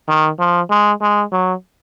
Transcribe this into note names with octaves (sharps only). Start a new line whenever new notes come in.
D#3
F3
G#3
G#3
F#3